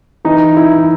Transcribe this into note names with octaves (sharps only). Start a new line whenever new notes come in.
E3 D#4
E4
E3